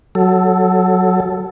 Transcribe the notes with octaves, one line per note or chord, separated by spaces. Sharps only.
F#3 A4